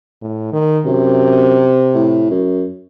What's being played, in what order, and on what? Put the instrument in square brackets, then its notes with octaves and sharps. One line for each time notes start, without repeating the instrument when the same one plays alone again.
[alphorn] A2
D#3
[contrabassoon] F#2 [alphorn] C3
[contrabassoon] A2
F#2